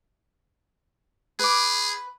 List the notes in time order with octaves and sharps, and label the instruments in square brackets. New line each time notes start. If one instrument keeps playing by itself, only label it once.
[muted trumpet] G#4 [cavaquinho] B4 D6